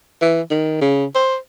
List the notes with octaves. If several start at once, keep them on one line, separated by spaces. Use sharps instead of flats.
E3
D#3
C#3
C5